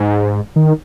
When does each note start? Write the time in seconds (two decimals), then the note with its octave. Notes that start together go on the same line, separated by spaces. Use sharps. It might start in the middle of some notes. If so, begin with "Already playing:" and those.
Already playing: G#2
0.56 D#3